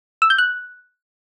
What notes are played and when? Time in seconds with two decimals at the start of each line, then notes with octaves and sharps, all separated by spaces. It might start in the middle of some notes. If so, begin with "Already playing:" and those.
0.22 E6
0.30 G6
0.38 F#6